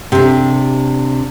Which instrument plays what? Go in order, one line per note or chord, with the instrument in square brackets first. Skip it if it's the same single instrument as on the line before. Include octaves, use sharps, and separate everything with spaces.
[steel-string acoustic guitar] C3 D4